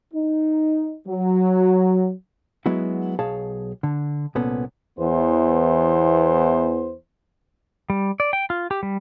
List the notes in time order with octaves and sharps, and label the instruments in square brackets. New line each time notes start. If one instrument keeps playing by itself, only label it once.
[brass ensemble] D#4
F#3
[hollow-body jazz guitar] F#3 G#3 B3 E4 F#4
B1 G#4 C#5 F5 A5
D3
C2 A#2 B3 C#4 A4
[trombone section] E2 E3 B3 C5
[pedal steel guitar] G3
D5
G5
F4
G4
G3